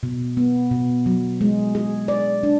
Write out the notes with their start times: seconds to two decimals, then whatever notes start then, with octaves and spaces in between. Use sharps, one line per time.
0.03 B2
0.37 B3
0.71 B2
1.06 F#3
1.41 G#3
1.75 G#4
2.08 D5
2.43 D4